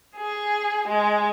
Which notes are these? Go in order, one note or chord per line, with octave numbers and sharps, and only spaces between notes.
G#4
G#3